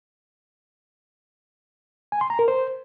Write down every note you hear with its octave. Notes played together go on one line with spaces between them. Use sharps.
G#5
C6
A#5
A#4
C5